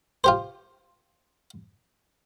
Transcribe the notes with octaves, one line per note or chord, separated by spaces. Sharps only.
F4 G4 C5